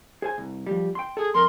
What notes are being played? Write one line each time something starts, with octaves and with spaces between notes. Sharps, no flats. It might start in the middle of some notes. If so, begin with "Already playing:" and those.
G#4 C5 G#5
C2
F3 G3
G5 C6
G#4 A4
F2 A#4 C6